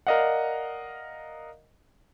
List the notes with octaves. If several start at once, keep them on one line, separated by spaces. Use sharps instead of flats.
A#4 D5 D#5 F5 F#5